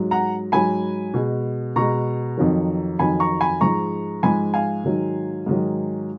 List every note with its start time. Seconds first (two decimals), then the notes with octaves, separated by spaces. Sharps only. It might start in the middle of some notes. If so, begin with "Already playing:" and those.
Already playing: G#2 F#3
0.11 F#5 A#5
0.52 G#2 F#3 G#5 B5
1.14 B2 G#3
1.76 B2 G#3 A#5 C#6
2.38 F2 D#3 F#3
2.99 F2 D#3 F#3 G#5 B5
3.20 A#5 C#6
3.41 G#5 B5
3.61 G#2 F3 G#3 A#5 C#6
4.23 G#2 F3 G#3 G#5 B5
4.54 F5 G#5
4.84 G#2 D#3 F#3
5.46 G#2 D#3 F#3